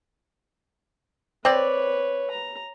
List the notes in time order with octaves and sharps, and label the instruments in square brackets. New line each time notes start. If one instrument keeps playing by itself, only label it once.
[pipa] C4 D5 [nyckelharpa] B4 C#5
[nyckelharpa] A#5